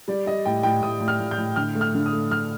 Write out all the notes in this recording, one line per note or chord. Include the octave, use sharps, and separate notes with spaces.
G3 D5
G3 D#5
A2 G5
A2 G5
A2 D#6
A2
F6
A2
G6
A2
D3 F6
A3
F6
D3
D#6
A3
D3 F6